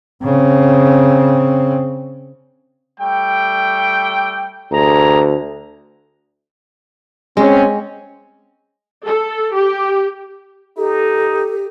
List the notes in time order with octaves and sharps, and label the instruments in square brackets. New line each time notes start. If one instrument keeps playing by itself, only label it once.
[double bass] C#3 C4
[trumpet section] G3 A3 G5
[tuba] D2 [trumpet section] G#4 A#5
[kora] G#3 [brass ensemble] C4 C#4
[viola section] A4
G4
[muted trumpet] D#4 [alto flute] G4 [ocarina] A4